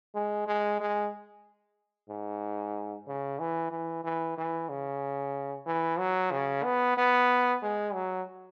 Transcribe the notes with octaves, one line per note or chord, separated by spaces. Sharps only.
G#3
G#3
G#3
G#2
C#3
E3
E3
E3
E3
C#3
E3
F#3
C#3
B3
B3
G#3
F#3